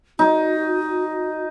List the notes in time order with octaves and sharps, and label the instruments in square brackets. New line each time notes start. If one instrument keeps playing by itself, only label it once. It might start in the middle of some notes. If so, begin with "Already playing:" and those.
[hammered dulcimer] D#4 [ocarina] F#4